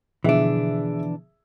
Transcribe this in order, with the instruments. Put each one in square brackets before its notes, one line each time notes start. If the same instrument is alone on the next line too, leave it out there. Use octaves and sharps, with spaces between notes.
[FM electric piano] B2 D3 F3 [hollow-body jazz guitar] E3 D4 [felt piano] G#4 E5